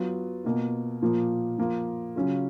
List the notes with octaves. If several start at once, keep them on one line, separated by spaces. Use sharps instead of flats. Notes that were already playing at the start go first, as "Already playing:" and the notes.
Already playing: F#3 B3 F4
B2 A#3 F4
A#2 F3 A#3
F3 A#3 F4
C#3 F#3 C#4 F4